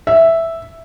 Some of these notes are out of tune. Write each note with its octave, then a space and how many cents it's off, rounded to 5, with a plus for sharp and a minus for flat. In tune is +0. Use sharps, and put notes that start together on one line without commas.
E5 +0